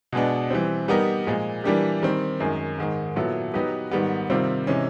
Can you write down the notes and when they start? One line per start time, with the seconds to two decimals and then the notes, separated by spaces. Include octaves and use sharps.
0.13 B2 G#3 B3 D4
0.50 E3 G3 C4
0.88 G3 B3 D#4 G4 A#4
1.27 A#2 F3 G#3
1.64 E3 G3 A#3 D4 G4
2.03 D#3 G3 C4
2.40 F#2 D#3 G#3
2.78 G#2 D#3 G#3
3.16 A#2 F#3 B3 E4 A4
3.54 F#3 B3 D#4 G4 B4
3.91 G#2 D#3 G3 B3
4.30 C3 D#3 G3 C4 F4
4.67 C3 E3 G#3 C#4